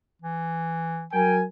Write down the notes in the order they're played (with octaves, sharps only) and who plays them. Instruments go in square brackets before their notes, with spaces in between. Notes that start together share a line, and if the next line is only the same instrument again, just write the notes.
[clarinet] E3
[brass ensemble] F#3 A#4 G#5 [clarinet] G5